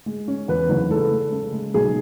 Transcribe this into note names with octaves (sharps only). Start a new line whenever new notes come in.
G#3
C#4
E2 B4
F#1
G#3 A4
G#3
C#3
G#3
B1 G#4